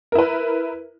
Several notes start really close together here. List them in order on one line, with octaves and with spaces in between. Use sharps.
A#4 E4 B4